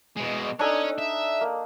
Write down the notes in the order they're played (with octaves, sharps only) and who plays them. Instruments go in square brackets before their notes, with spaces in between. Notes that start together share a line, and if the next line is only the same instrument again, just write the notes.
[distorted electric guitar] B2 G#3
[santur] D4 D#4 A4 [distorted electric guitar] C#5 G#5
[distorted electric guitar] E5
[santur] A#3